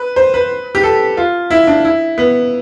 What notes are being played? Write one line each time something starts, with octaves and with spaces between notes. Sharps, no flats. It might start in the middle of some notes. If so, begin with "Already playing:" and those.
Already playing: B4
C5
B4
G4
A4
F4
E4
D4
E4
B3